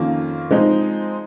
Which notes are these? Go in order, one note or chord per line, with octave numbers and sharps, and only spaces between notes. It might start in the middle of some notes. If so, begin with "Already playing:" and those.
Already playing: F2 D#3 A#3 C#4 F4
F3 G#3 C4 D#4